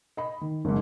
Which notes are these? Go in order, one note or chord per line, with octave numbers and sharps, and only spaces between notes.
D#5 B5
D#3
F#1 G#2